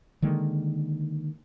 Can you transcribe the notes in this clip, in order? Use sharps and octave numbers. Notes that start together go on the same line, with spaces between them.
D3 D#3 G#3 A#3